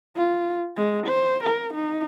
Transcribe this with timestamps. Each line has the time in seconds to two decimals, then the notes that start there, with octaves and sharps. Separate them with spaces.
0.17 F4
0.77 G#3
1.07 C5
1.44 A#4
1.74 D#4